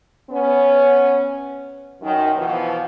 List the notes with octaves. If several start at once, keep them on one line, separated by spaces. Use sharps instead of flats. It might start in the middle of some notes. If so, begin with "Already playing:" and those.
B3 C#4
F#2 D#3
B2 E3 F3